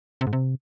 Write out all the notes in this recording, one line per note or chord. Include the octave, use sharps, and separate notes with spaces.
C3
G#2
C3